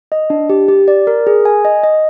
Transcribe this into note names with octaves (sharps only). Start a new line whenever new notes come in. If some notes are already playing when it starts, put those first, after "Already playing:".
D#5
D4
G4
G4
D5
A#4
G#4
G#5
D#5
D#5